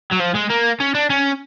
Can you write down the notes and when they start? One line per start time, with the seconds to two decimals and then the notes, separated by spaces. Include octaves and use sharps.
0.12 F#3
0.20 F3
0.35 G#3
0.50 A#3
0.80 C#4
0.95 D4
1.10 C#4